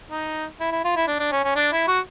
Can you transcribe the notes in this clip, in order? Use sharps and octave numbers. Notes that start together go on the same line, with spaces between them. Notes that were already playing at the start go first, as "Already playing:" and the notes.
D#4
E4
E4
F4
E4
D4
D4
C#4
C#4
D4
E4
F#4